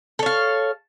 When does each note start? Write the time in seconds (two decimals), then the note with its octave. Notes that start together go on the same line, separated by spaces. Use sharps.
0.19 A4
0.23 C#5
0.26 F5